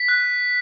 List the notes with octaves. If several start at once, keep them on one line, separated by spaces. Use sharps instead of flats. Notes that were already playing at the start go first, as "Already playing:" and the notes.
Already playing: B6
F#6